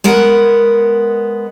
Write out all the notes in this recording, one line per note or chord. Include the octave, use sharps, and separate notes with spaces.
G#3 B3 A#4 F#5